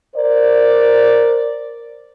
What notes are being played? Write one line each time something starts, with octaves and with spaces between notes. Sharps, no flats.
A#4 C5 D5